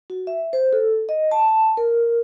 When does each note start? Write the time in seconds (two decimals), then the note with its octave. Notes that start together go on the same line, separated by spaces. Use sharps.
0.10 F#4
0.27 E5
0.53 C5
0.73 A4
1.09 D#5
1.31 A5
1.48 A5
1.77 A#4